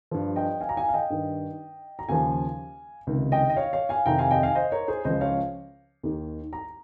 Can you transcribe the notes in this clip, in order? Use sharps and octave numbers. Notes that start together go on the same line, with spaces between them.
G2 F3
D#5 G5
F5 G#5
A#5
F5 G#5
F5
D#5 G5
G2 D#3
A#5
D#2 C#3 F3 F5 G#5
C#2 C3 D#3
D#5 G5
D#5
C#5 F5
C#5 F5
F5 G#5
F2 C3 D#3 G5 A#5
F5 G#5
D#5 G5
F5 G#5
C5 D#5
A#4 C#5
G#4 C5
C#2 C#3 F3 C5 D#5
C#5 F5
D#2 D#3
A#5